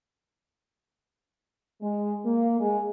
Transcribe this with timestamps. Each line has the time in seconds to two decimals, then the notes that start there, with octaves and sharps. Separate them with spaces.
1.82 G#3
2.25 A#3
2.60 G#3